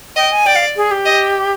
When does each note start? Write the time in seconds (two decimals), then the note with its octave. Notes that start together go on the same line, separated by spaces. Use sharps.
0.16 D#5 G5
0.32 G#5
0.46 D5 G5
0.56 F5
0.77 G#4
0.91 G4
1.06 D#5